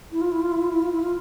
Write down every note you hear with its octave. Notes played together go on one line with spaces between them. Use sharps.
E4
F4
E4
F4
E4
F4
E4
F4
E4
F4